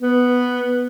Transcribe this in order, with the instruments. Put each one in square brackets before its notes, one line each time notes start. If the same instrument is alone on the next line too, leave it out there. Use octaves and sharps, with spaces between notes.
[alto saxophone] B3